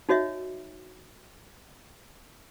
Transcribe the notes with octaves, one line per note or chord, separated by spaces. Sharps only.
D#4 F#4 C#5 D#5 E5